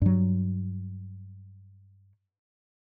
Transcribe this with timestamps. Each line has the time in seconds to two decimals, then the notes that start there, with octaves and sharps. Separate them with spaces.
0.02 G2 F#3